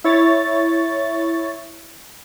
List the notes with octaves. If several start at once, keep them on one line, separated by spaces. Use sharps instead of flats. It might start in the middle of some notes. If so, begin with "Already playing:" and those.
E4 C#5 A6